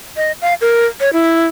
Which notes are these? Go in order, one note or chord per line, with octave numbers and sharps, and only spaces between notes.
D#5
F5
A#4
C#5
E4